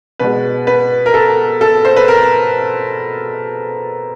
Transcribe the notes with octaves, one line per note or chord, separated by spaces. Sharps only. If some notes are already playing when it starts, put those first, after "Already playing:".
B2 G#3 B4
B4
A#4
A4
A4
C5
B4
A#4